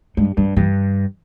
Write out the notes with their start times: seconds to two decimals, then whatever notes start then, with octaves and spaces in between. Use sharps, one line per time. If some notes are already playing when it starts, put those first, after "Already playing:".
0.17 G2 G#3
0.37 G2 G3
0.57 G2 E3